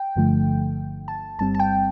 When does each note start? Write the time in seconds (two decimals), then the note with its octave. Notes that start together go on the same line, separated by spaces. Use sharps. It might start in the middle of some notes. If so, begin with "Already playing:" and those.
Already playing: G5
0.16 G1 G2 D3 F3 A3
1.08 A5
1.39 G1 G2 G3 C4 A5
1.55 A5
1.59 G5